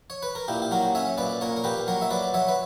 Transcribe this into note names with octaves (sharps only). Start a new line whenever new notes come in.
C#5
B4
A#4
A#2 E4 G4
G4
F#3 F#4 A#4
C#4 C#5 E5
A#2 B4 D5
A#2 A#4 C#5
A#4
A#2 G4 B4
F#3 A#4 C#5
E5
F#3 B4 D5
F#3 C#5 E5
B4